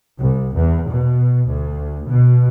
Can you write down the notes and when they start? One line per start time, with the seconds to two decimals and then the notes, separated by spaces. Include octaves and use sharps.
0.19 C2
0.57 E2
0.89 B2
1.48 D2
2.08 B2